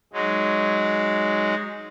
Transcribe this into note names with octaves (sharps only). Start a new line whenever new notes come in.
F#3 G#3 D#4